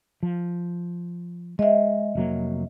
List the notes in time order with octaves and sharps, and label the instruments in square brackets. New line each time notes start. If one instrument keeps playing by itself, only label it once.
[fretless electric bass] F3
[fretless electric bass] G#3 [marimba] D#5 E5
[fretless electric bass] F1 F#3 A#3